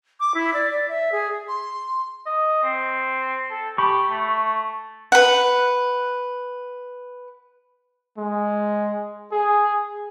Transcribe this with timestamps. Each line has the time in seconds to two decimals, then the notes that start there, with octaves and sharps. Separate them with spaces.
0.20 D6
0.35 E4
0.54 D5
0.70 D5
0.89 E5
1.12 G#4
1.48 C6
2.26 D#5
2.64 C4
3.51 A4
3.78 G4 B5 C#6
4.09 A3
5.12 B4 F#5
8.18 G#3
9.32 G#4